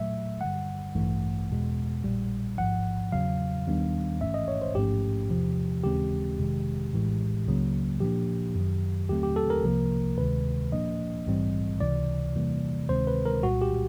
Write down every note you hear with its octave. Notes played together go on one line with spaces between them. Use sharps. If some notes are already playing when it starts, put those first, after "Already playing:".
Already playing: A#2 F#3 A3 E5
G2 D3 G3 F#5
A1 G2 E3 A3
E2 B2 G#3
A#1 A#2 G3
A1 G#2 F3 F#5
E2 C#3 F#3 F5
D#2 D#3 G3 B3 D4
A1 G#2 E3 A3 C#4 E5
D#5
C#5
C5
A1 G#2 F3 A3 C#4 G4
E2 C3 F3
D#2 C#3 E3 G#3 C4 G4
G1 F2 C3 D#3 G#3
A#1 A2 E3 G#3
C#2 C#3 F#3 A#3
A#2 F3 A#3 D4 G4
F#2 D#3 F#3
D#2 D3 F#3 A3 C4 G4
G4
A4
A#4
C2 C3 F3 A#3
D2 C3 D#3 G#3 B4
A#2 F3 A#3 D4 D#5
A#1 G#2 E3 G3 C4
C#2 C3 E3 D5
E2 C3 E3 G3 A#3
D2 C3 D#3 G#3 C4 C5
B4
A#4
C2 A#2 G3 F#4
G4